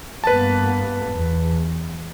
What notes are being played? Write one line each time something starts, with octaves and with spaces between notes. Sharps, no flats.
G2 A#3 B3 B4 A5
E2